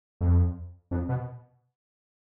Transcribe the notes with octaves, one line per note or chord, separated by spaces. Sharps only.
F2
F2
B2